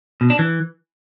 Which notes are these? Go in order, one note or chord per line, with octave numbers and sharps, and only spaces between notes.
B2
D4
E3